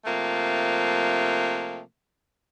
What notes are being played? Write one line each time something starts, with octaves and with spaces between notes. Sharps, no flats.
C3 F3 A3 A#3